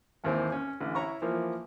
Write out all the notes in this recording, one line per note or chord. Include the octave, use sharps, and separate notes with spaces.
G#1 D#2 E3 C4
C#4
A1 D3 E3
E4 C#5 A#5 C#6
E3 F3 A#3